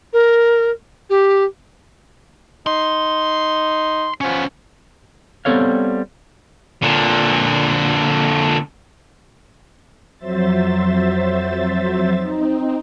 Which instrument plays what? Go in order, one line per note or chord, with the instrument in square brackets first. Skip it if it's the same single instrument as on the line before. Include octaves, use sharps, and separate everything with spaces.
[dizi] A#4
G4
[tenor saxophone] D#4 [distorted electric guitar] C6
[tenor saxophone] F3 [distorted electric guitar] B3 C#4
[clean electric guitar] G3 B3 C4 A4 C#5 F5
[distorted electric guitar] A#2 D3
[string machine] F2 F#3 C5 E5 A6
C4 D#4